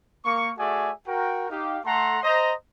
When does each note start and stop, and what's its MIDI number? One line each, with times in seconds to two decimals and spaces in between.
0.25 0.51 58
0.25 0.51 85
0.57 0.91 57
0.57 0.91 66
0.57 0.91 68
0.57 0.91 74
0.57 0.91 76
0.57 0.91 80
1.07 1.49 66
1.07 1.49 70
1.07 1.49 79
1.50 1.78 63
1.50 1.78 67
1.50 1.78 77
1.85 2.19 57
1.85 2.19 69
1.85 2.19 78
1.85 2.19 82
1.85 2.19 84
2.23 2.53 72
2.23 2.53 75
2.23 2.53 82